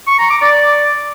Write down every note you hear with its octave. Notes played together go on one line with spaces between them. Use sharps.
C#6
A#5
D6
D5